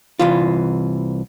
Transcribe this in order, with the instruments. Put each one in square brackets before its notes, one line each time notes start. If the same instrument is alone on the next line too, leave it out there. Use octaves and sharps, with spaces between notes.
[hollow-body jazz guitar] C2 E3 F4